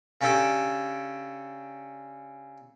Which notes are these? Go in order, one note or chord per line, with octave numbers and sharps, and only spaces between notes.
C#3 C#4 D4 G4 A4 D6